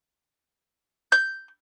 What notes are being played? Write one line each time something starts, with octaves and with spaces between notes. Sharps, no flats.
G6